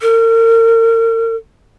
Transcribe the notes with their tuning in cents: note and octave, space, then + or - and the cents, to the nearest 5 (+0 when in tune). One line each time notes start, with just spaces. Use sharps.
A#4 -40